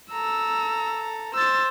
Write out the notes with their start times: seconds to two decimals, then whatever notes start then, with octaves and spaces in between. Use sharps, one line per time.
0.12 A4 A#5 E6
1.34 C5 E6 A6